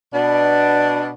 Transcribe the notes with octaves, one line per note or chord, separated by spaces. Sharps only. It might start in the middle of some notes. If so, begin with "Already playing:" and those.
B2 D4